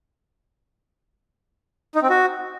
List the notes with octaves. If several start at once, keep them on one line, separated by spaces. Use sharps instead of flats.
D#4
C4
F#4